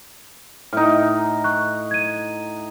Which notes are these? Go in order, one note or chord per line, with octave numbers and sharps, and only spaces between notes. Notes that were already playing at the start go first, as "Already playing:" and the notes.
A2 D#4 F6
C#6 F#6
G#6 D#7